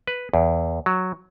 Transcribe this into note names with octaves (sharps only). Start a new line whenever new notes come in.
B4
E2
F#3